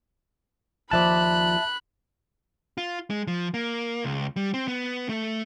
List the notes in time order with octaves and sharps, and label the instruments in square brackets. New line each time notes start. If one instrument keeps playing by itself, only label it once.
[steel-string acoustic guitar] D#2 F3 D5 [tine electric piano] E5 A5 [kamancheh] B5 F#6
[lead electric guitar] F4
G#3
F3
A#3
C#2
G3
C4
B3
A3